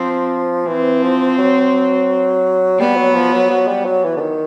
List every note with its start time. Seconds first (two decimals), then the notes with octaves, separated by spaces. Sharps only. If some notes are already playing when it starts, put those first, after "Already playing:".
Already playing: F3 C4
0.67 E3 C4
1.03 F3
1.38 F#3
2.80 G3 B3
2.97 F#3
3.14 F3
3.33 F#3
3.50 F#3
3.68 G3
3.85 F#3
4.04 E3
4.17 D3
4.21 D#3